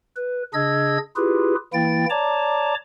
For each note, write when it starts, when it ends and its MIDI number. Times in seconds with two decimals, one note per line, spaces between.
0.16 0.43 71
0.54 0.98 49
0.54 0.98 62
0.54 0.98 68
0.54 0.98 75
0.54 0.98 88
0.54 0.98 92
1.16 1.55 64
1.16 1.55 65
1.16 1.55 67
1.16 1.55 68
1.16 1.55 71
1.73 2.06 52
1.73 2.06 58
1.73 2.06 64
1.73 2.06 79
1.73 2.06 93
2.10 2.74 73
2.10 2.74 74
2.10 2.74 81
2.10 2.74 82
2.10 2.74 86